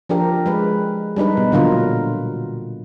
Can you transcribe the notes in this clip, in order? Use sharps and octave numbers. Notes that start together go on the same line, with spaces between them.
F3 D4 G4 A#4
G#3 B4
G3 D4 D#4 B4
B2
A#2 D3 F#3 F4 A#4